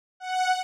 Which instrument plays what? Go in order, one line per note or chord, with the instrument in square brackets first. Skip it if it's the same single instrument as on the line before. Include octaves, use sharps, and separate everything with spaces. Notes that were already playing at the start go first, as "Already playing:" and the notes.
[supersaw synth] F#5